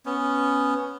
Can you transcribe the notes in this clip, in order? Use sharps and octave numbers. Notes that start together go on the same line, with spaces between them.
B3 C#4